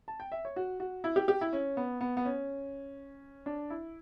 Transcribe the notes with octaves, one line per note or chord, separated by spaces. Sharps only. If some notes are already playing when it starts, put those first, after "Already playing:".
A5
G5
E5
C#5
F#4
F#4
E4
G4
G4
E4
C#4
B3
B3
B3
C#4
D4
E4